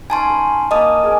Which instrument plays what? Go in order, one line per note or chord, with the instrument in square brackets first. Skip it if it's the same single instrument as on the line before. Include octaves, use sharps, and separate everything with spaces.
[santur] C#4 D#4 [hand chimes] G#5 A5 C6
[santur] A#5 B5
[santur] A#3 B5 [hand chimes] D#5 A5 D#6
[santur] G#4 A#4 D5